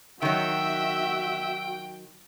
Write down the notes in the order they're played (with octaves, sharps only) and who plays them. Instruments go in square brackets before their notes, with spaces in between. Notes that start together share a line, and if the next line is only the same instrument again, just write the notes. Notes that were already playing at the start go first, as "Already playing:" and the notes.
[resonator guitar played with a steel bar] D#3 F#3 [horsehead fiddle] F#4 [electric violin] E5 [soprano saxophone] G5